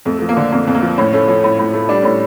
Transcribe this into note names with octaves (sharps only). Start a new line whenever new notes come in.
F2 A3
F3 A3
A#3
D3
F2 A#3
F2
A#3
F3
A2 C#4
A3 C#4
F3 C#4
A2
A2
A3
G3 D4
A2 C#4